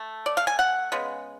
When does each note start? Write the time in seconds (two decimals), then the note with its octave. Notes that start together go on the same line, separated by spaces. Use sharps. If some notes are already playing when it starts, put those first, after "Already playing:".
Already playing: A3
0.26 D5
0.37 F5
0.47 G#5
0.59 F#5
0.92 C#3 G#3 B3